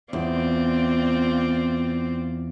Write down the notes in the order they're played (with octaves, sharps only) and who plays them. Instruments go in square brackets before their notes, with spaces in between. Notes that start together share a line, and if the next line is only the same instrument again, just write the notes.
[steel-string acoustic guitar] E2 [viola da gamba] C4 F4 D5